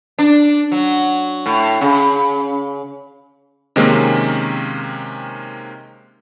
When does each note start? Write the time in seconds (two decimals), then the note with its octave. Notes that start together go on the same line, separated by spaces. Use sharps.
0.19 D4
0.72 F#3
1.46 A2
1.81 C#3
3.76 C3 D#3 G#3 A#3 C4 C#4